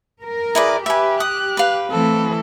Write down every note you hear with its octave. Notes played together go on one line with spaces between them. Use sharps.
A#4
E4 G#4 B4 D5
G4 B4 E5 G#5
D#6 F#6
B4 F5
E3 A3 C4 A4